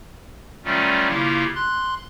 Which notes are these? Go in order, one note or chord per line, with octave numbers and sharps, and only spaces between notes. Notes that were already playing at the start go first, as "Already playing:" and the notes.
D#3 F#3 G3 A3 C#4 F4
C#3 A#3 E4 F4 G4
C6 F#6